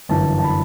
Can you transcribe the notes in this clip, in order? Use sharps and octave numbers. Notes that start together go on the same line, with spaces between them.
G1 F#2 E3 A5
A5
B5